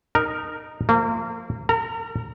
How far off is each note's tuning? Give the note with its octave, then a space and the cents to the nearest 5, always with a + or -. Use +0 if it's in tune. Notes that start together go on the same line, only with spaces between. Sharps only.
D#4 -15 A#4 +0
F3 +0 A#3 -35
A#4 -40 A#5 +0